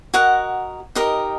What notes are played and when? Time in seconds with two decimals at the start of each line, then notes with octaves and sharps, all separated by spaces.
0.14 F#4 A#4 D#5 F#5
0.95 D#4 G4 A#4 D#5